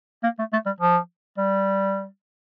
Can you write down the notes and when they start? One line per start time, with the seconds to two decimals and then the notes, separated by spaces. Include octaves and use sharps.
0.23 A#3
0.39 A3
0.53 A3
0.66 G3
0.80 F3
1.38 G3